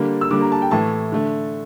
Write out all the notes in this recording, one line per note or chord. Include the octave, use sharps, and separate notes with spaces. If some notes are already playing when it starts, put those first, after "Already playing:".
Already playing: D3 G3 A#3
E6
D3 G3 A#3 D6
A#5
A5
G5
A2 E3 A3 A5
D3 A3